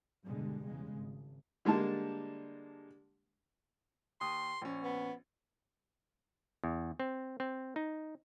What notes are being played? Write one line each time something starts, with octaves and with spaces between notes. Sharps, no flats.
G2 B2 D3 G3 G#3
E2 C#3 G#3
G#1
D3 G3 G#3 A#3 D4 A5
D#2 C6 D#6
A#1 C#4
B3
E2
C4
C4
D#4